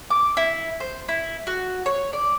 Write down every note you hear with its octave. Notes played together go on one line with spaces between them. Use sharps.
D6
E4
C5
E4
F#4
C#5
D5